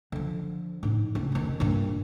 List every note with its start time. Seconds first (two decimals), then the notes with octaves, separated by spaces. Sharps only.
0.12 D3 F3
0.83 A2 D#4
1.15 C#2
1.32 F1 D#3
1.60 G2 A#2